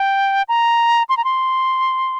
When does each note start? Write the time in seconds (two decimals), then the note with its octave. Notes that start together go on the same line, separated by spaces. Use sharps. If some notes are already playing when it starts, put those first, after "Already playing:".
Already playing: G5
0.48 A#5
1.09 C6
1.17 A#5
1.24 C6